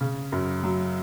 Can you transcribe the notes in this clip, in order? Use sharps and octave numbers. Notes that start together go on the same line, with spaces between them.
C#3
F#2
F#3